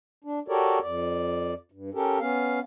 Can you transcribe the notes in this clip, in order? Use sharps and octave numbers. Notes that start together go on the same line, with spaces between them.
D4
F#4 G4 A4 A#4 C#5 D5
F2 D5
G2
C#4 G4 A4 A#4
B3 C#4 F5